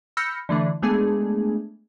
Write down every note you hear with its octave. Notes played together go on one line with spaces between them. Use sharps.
B5 E6 F6 G6 A#6 C#7
D3 E3 A3 D4
G#3 A3 B3 D4 G#4